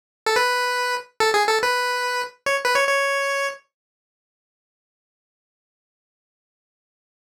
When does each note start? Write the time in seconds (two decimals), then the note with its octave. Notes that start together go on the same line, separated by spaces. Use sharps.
0.26 A4
0.36 B4
1.20 A4
1.34 G#4
1.48 A4
1.63 B4
2.46 C#5
2.65 B4
2.75 C#5
2.89 C#5